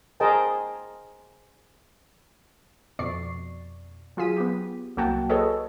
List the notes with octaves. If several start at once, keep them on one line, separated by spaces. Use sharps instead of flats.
G#4 A#4 C5 D#5 G5 A5
F2 B2 D5 C#6 C7
F#3 F4 G#4 B6 D#7
B3 G4
C2 F#3 A#3 F#4 G5 A5
G#4 A4 B4 C#5 D#5